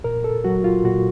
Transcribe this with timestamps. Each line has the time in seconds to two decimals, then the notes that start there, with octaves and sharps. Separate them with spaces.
0.04 A#2 A#4
0.24 A4
0.44 F#3 F#4
0.64 F4
0.84 A#2 F#4